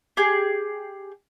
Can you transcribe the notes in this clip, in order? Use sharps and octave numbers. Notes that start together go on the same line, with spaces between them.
G4 G#4